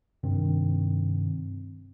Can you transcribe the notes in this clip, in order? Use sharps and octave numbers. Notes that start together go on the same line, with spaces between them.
G2 C3 D#3 C4